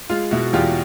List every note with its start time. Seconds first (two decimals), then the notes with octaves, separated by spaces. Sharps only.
0.10 G#3 F4
0.31 B2 E4 F#4
0.53 E2 F4 G4